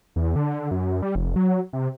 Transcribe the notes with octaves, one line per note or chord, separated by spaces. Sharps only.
E2
D3
F#2
G3
F1
F#3
C3